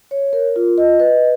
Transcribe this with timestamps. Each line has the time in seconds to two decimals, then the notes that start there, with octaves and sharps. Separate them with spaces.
0.11 C#5
0.33 A#4
0.56 F4
0.78 D#5
1.00 B4